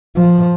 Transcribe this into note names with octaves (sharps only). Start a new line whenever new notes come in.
F3